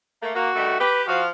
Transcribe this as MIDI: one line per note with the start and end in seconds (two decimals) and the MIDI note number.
0.23 0.32 57
0.23 0.32 58
0.35 0.50 58
0.35 0.78 66
0.56 0.75 43
0.56 0.75 51
0.56 0.75 57
0.81 1.04 67
0.81 1.03 71
1.08 1.27 53
1.08 1.23 66
1.08 1.27 77